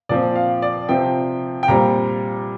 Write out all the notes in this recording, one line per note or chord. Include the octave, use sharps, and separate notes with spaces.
A#2 F3 C4 D5
F5
D5
C3 F3 C4 G5
G5
A#2 G3 C4 A#5